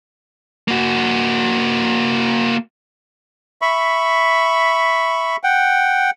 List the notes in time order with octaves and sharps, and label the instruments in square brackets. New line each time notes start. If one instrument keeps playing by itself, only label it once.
[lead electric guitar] A#3 F#4
[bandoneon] E5 B5 C#6
F#5 G5